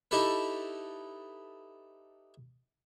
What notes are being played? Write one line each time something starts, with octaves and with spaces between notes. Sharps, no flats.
D#4 E4 G4 A4 B4